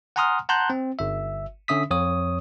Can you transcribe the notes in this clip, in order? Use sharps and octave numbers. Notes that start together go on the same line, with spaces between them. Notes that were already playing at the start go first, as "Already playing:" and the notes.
F#5 G#5 A#5 C6 D#6 F6
F#5 A5 A#5 C6 F#6 G6
C4
G1 E5
D3 C#4 E5 D#6 B6
F2 C#5 D#6